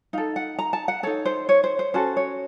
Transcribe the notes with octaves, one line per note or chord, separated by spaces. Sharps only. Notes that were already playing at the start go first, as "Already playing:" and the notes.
D#4 A4 F5
F#5
A#5
A5
F#5
D#4 A4 C#5
C5
C#5
C5
C5
C#4 F#4 A4 C5
C#5